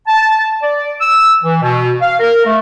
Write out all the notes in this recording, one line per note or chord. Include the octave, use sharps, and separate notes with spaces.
A5
D5
E6
E3
B2
F5
A#4
A3